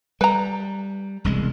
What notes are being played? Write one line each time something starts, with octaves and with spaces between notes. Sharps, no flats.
G3 B4 A#5
E1 C2 G#3